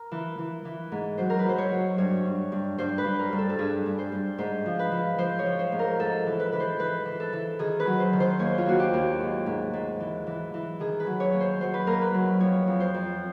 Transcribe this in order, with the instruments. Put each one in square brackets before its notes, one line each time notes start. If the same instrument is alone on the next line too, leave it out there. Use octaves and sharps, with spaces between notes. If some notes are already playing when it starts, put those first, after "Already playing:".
Already playing: [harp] A#4
E3
E3
E3
G#2
F#3 C5
A#4
B4
F#3 C5
C#5
F#3
G2 C#5
G2
G2
G2 C5
B4
G2
A#4
G2
A4
A4
G2 G#4
G2
C5
G2
G#2 C5
F3
B4
F3
F3 C5
C#5
F3
C5
G#2
A#4
G#2 A4
E3
B4
E3 B4
C5
E3 B4
E3
A4
E3
D#3 G#4
B4
F#3
C5
D#3
C5
D#2 C#5
F4
D#2 F#4
G4
D#2
G#2
G#2
G#2
E3
E3
E3
D#3 G#4
B4
F#3
C#5
D#2
C5
F#3 C5
B4
D#2 A#4
B4
F#3
F2 C#5
F2
C5
F2